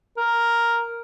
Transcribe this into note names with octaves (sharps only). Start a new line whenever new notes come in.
A#4